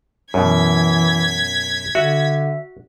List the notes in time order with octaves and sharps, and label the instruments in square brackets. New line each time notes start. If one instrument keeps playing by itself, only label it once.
[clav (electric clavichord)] F#2 B2 [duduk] E3 [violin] G#6 B6
[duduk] D3 [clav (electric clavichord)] F#4 [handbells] E5